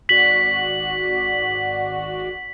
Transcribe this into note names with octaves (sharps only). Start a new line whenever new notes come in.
G#1 F#4 D5 B6 F#7